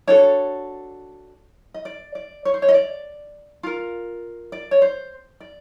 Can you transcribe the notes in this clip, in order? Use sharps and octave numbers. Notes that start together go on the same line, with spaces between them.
D4 F#4 A4 C#5
D#5
D5
D5
C#5
C5
C#5
D#5
D5
F4 A#4
D5
C#5
C5
D5